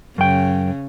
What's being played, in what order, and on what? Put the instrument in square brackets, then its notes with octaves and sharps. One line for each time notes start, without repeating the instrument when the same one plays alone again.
[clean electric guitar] F#2 G5 [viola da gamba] C#3